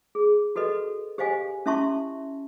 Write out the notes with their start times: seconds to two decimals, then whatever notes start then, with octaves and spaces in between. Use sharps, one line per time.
0.15 G#4
0.56 F#4 A4 B4 D#5
1.18 G4 C5 D#5 F5 G#5
1.66 C#4 E4 E5 A5 C6 C#6